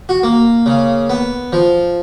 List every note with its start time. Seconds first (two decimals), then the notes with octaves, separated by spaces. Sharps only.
0.09 F#4
0.23 A#3
0.66 C#3
1.09 B3
1.53 F3